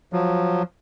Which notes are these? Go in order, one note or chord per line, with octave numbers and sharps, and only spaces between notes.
F3 F#3